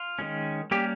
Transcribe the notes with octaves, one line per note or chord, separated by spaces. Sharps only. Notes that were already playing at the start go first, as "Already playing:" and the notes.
Already playing: F4
D#3 G#3 C#4
G3 A#3 C#4 G4